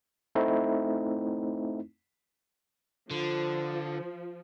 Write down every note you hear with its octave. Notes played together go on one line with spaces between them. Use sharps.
A3 C4 D#4 E4
D3 F3